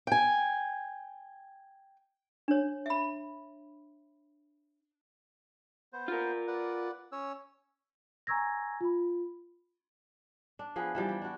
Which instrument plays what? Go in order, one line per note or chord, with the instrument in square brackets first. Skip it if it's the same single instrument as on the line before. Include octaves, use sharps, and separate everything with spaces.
[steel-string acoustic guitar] G5 G#5
[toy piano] D4 C#5
E5 B5
[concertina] B3 C5
[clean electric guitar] F4 A#4
[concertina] B4 D5 F#5
C#4 C#5 E6
[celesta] G#5 A#5 C#6 E6 G#6 A#6
F4 B5
[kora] D4
F3 B3 G#4 B4
E3 F3 G3
G4
D4 F#4